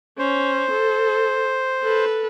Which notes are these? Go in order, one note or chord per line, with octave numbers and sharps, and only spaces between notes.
C#4 C5
A4
A4 B4